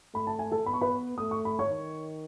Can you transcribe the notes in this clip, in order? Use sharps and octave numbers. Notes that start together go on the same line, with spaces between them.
A3 B5
A5
G#5
A4 A5
B3 B5
C#6
B4 B5
A3 D#6
C#6
B5
C#5 C#6
D#3